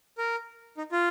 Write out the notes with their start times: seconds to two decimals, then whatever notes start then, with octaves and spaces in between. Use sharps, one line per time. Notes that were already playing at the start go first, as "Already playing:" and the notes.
0.18 A#4
0.78 D#4
0.92 F4